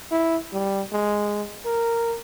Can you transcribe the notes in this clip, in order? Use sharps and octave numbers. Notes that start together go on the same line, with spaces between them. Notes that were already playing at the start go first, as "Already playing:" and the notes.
E4
G3
G#3
A#4